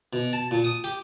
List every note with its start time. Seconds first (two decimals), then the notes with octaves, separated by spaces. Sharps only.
0.13 B2
0.33 A5
0.51 A#2
0.64 D#6
0.84 G4